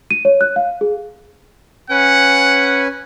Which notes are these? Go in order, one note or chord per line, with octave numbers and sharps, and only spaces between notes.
D#7
C#5
F#6
F5
G#4
C#4 B4 F#5 G#5